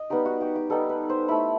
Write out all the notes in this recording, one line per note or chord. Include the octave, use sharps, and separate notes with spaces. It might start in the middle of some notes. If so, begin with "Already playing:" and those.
Already playing: D#5
G3 B3 D#4 G4
F#4
G4
G4
G3 B3 D#4 A4
B4
C5
A3 E4 B5